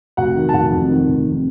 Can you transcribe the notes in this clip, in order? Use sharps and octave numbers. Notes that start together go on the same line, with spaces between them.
F1 F#4 F#5
D#3
A5
F1 F#4 F#5
F2
D#3
F1
F2